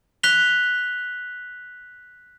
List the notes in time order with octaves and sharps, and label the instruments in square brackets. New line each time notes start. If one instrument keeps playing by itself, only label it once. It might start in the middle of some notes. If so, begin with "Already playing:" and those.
[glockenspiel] F#6 B6 F7 G7